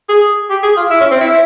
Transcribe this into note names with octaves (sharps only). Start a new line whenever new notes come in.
G#4
G4
G#4
F4
E4
C#4
C4
E4